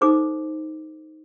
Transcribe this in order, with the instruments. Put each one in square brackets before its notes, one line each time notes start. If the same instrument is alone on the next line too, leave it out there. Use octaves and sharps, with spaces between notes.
[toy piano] D#4 A4 C5 D6